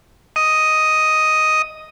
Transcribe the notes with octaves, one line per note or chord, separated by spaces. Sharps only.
D#5 D#6